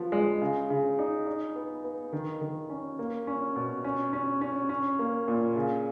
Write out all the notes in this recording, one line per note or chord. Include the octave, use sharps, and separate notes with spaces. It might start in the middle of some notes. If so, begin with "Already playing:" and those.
Already playing: F3 B3
G#3
C#3
C#3
D#4
D#4
B3
B3
D#3
D#3
C#4
A#3
C#4
B2
C#4
C#4
C#4
C#4
A#3
A#2
C#3